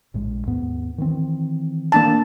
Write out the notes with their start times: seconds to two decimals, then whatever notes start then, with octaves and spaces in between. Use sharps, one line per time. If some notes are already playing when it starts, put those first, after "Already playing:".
0.14 A#1 A2 G#3
0.47 D#2 G#2 B3
0.98 D#3 E3 C4
1.92 A#3 D4 A5